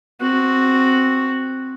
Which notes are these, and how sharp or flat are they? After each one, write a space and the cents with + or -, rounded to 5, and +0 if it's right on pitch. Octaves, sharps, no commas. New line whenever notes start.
C4 +0 F#4 +0